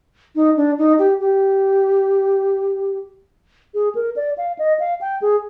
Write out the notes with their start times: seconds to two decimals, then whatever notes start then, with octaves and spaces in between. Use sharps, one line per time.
0.35 D#4
0.57 D4
0.78 D#4
0.99 G4
1.20 G4
3.74 G#4
3.95 A#4
4.16 D5
4.38 F5
4.59 D#5
4.80 F5
5.01 G5
5.22 G#4